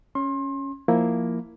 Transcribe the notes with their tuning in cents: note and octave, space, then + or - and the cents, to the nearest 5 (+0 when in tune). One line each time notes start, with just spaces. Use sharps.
C#4 +0 C6 +30
F3 +0 A#3 +0 E4 +0